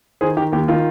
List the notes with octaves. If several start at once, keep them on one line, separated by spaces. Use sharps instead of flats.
D#3 G#4 C5
D#3 G4
D#2 G4
D#3 F4